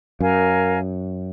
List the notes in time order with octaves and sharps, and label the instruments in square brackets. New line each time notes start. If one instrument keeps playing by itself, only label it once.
[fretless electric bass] F#2 [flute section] A#4 F5 G#5